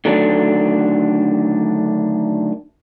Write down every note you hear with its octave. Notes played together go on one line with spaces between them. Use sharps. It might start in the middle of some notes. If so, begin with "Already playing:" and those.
D3 D#3 F#3 A3 D4